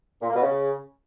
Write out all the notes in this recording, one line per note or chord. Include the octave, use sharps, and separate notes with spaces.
A#2
A#3
B2
C#3